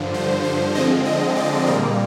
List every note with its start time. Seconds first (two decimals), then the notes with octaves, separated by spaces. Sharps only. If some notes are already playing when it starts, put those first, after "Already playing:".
Already playing: G2 D3 F3
0.14 C5
0.44 C5
0.75 D3 F3 G#3 C4 D#5
1.05 D#5
1.36 D5
1.67 A#2 G3 A#3 A#4